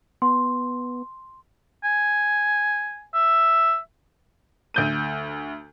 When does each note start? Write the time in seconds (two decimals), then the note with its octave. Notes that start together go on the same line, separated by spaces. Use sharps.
0.22 B3 C6
1.84 G#5
3.14 E5
4.74 D2 G6 D#7